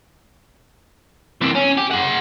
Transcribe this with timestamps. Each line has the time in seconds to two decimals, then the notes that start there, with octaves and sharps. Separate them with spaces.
1.42 C3 E3
1.55 C#4
1.77 G4
1.91 G#4 F#5